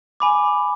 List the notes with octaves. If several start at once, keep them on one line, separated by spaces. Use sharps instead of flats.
G#5 B5 D6